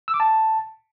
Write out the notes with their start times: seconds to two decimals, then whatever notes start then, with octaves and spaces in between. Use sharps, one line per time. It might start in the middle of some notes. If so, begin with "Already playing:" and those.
0.08 E6
0.14 D6
0.20 A5